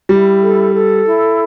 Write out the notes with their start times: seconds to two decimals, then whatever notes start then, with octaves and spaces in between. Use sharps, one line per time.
0.09 G3 E4
0.41 A4
0.73 A4
1.05 E4